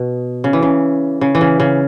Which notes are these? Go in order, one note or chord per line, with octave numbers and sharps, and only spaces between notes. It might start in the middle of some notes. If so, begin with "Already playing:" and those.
Already playing: B2
C#3
E3
C#3
C#3
E3
C#3
C#3